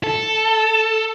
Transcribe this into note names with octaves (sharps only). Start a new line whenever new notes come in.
A4